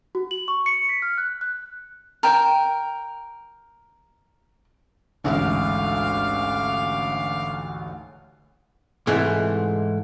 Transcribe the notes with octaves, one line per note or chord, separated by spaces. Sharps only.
F#4
F#7
C#6
C#7
B6
F6
F#6
F#6
A#4 G5
A1 D2 G#2 F5 D6
G#2 C3 E3 G#3 A3